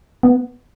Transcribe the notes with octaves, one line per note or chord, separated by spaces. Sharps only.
B3